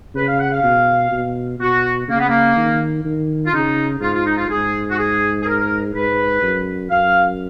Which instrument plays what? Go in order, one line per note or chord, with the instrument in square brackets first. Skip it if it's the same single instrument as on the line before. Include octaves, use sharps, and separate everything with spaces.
[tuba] C#3 [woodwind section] B4
[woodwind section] F5
F#5
F5
[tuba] B2
B2
[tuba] B2 [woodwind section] F#4
[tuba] C#3 [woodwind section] A#3
[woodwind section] B3
A#3
[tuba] D#3
D#3
[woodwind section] F4
[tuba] C#3 [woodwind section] D#4
[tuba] G#2 [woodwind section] F4
[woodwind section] F4
D#4
F4
[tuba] G#2 [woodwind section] G#4
[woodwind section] F#4
G#4
G#4
A#4
[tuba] G#2 [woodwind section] B4
[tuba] F#2
[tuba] F#2 [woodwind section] F5